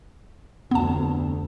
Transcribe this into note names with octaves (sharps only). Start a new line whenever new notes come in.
F1 D2 B3 A5